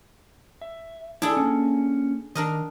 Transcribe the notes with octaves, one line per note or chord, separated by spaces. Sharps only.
E5
D4 E4 G#4 A4 D5 A5
A#3 C#4
D#3 D4 A#4 D#5